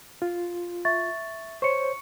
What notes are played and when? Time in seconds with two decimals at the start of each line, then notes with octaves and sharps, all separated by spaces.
0.22 F4
0.85 E5 C#6 A6
1.62 C5 C#5 C#6 C#7